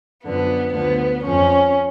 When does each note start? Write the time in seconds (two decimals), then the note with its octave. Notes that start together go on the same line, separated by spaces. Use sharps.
0.24 F#2 D3 F3 B3
0.73 D2 D3 F3 B3
1.22 F2 F3 C#4